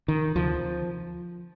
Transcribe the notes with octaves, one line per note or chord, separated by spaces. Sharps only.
D#3
D2 C3 F3